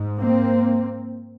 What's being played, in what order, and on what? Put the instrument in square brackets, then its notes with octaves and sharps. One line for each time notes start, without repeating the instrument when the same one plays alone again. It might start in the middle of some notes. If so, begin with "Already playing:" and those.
Already playing: [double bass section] G#2
A#3 C4